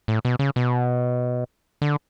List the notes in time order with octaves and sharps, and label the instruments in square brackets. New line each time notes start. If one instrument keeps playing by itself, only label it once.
[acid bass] A2
B2
C#3
B2
D3